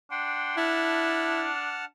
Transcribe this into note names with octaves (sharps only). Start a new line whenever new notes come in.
D4 F#5 G5 C6
E4 F#5 A5 F6